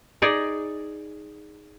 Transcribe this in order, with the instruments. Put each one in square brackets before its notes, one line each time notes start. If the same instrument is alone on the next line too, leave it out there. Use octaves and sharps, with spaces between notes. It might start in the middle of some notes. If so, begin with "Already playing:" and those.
[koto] D#4 G#4 D5